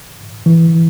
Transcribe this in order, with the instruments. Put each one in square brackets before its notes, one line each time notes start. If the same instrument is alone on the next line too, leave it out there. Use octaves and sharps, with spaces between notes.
[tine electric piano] E3